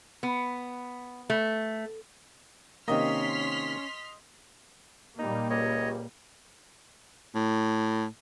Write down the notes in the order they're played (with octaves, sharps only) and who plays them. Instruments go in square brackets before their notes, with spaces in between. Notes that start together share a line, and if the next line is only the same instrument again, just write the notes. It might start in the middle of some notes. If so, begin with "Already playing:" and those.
[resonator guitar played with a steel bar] B3
A3
[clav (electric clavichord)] C3 D#3 A#3 [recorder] C#4 [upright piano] D#5 [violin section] C6 F6 B6
[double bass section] A#2 G3 A#3 [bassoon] D#4
[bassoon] C#2 [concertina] C#5 D#5
[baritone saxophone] A2